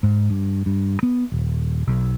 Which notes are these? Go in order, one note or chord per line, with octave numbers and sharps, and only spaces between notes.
G#2
G2
G2
B3
D#1
B1